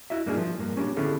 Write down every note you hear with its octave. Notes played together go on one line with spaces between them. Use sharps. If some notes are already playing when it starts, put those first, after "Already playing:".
E4 F#4 D#5 E5
G2 A#3 D4 D#4 G4 G#4
F3
G2 A#3
A#3 C#4 D4 G4
D3 B3 C#4 E4 G#4 A4